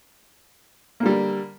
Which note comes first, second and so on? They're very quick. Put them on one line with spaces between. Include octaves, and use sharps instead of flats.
A#3 D3 G3